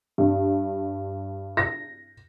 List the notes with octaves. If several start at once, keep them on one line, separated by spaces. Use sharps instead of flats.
G2
A#6